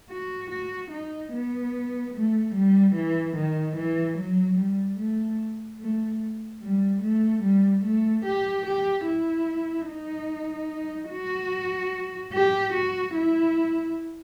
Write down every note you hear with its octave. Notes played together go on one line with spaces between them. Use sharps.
F#4
F#4
D#4
B3
A3
G3
E3
D#3
E3
F#3
G3
A3
A3
G3
A3
G3
A3
G4
G4
E4
D#4
F#4
G4
F#4
E4